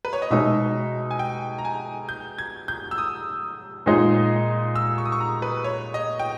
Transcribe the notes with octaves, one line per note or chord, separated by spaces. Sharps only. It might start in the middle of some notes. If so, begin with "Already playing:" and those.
B4
C#5
D#5
B2 G#3 D#4 E5
G#5
G5
A#5
G#5
G6
G#6
G6
E6
D#6
A#2 G#3 D#4
E6
C#6
D#6
C#6
A#5
B4
C#5
D#5
G5